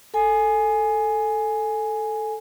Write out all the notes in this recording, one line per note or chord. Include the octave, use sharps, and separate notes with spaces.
A4 G#5